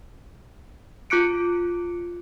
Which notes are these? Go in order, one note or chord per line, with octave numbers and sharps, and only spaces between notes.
F4 D6 F#6 C#7 D7